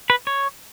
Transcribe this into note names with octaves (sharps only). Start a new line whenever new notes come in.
B4
C#5